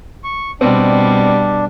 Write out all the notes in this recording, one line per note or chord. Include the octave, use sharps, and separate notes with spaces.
C#6
B2 G3 C4 D4